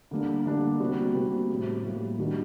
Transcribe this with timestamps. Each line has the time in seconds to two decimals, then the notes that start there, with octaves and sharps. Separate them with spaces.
0.11 D3 G3 A#3 D4
0.46 D3 G3 A#3 D4
0.80 C3 G3 A#3 F#4
1.15 C3 G3 A#3 F#4
1.49 A2 G3 A#3
1.84 A2 G3 A#3
2.19 D#3 G3 D4 F#4